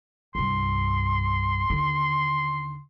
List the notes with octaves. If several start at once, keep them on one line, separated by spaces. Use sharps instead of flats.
C2 G2 C6
D#2 D3